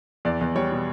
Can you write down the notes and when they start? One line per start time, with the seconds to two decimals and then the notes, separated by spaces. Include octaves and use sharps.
0.25 E2 D5
0.41 E2
0.55 G3 C#5
0.72 B2